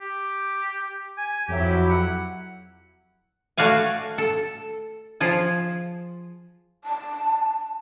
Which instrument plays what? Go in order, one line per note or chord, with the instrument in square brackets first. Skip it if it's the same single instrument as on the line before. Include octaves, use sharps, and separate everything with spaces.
[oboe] G4
G#5
[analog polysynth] F2 F#3 E4 [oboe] G4
[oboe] F#5
[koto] A3 F#4 D5 F5 G#5
A4
F3 F4 G#4
[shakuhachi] A5